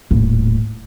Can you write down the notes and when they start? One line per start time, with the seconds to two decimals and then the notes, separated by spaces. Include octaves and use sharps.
0.11 D#1 A2